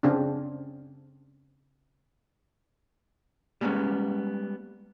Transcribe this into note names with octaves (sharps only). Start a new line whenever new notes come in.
C#3 C4 D4
G3 G#3 A#3 B3 C#4